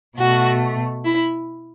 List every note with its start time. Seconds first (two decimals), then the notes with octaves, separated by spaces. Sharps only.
0.17 B2 A3 F#4
1.04 E4